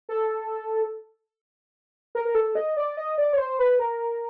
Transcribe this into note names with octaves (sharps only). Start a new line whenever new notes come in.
A4
A#4
A#4
A4
D#5
D5
D#5
D5
C#5
C5
B4
A#4